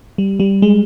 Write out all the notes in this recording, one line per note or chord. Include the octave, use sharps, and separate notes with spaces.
G3
G3
G#3